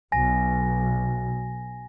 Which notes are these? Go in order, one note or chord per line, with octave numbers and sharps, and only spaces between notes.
B1 G#5 A#6